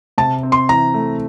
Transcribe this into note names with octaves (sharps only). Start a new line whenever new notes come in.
C3 A5
C4
C6
E3 A#5
A3